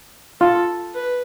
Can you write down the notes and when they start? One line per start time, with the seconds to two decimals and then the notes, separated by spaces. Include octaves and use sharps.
0.40 F4 A4
0.94 B4